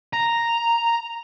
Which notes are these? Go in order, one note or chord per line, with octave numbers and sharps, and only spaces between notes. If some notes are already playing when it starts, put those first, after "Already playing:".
A#5